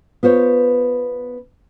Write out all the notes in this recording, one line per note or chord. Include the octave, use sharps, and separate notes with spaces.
B3 F4 C5 C#5